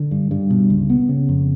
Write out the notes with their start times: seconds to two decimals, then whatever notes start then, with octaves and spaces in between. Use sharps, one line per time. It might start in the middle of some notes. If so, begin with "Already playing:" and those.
Already playing: D3
0.11 G2
0.31 G2
0.50 B2
0.70 C#2
0.90 B3
1.09 C#3
1.29 F2